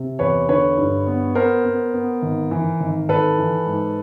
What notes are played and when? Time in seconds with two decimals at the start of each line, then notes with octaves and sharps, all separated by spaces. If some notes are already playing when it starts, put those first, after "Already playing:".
Already playing: C3
0.19 E2 B4 C#5
0.48 D3 B4 C#5
0.77 G2
1.07 B3
1.35 B3 A#4 C5
1.65 B3
1.94 B3
2.22 G#1
2.51 E3
2.80 G#1
3.09 G#1 A4 B4
3.38 E3
3.66 G#2